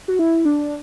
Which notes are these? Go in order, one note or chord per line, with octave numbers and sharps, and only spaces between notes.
F#4
E4
D4